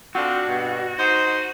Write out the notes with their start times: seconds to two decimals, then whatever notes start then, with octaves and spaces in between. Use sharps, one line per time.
0.15 C4 D4 F4 F#4
0.46 G2 B2
0.99 D#4 C5